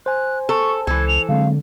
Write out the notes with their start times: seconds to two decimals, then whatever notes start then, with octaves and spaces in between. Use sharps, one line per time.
0.06 C5 G#5 F#6
0.49 A4 C#6
0.87 C#2 E3 A4 G#6
1.08 F7
1.29 D3 F#3 G#3 C4 F5